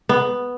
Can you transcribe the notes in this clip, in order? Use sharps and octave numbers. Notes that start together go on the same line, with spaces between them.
B3